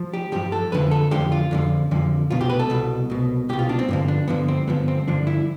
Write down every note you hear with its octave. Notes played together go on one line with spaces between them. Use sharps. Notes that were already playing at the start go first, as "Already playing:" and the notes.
Already playing: F3
G4
G2 F3 G4
A4
F2 D3 F3 B4
A4
F2 D3 F3 G4
F4
F2 D3 F3
F2 D3 F3
C2 B2 F4
G4
B4
A4
C2 B2
C2 B2
C2 B2 G4
F4
D4
C4
G2 D3 F3
D4
G2 D3 F3 B3
C4
G2 D3 F3 B3
C4
G2 D3 F3 D4
E4